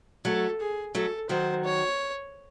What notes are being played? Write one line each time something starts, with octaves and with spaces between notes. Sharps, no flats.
F#3 A3 A4
G#4
F#3 A3 A4
D#3 F#3 C5
C#5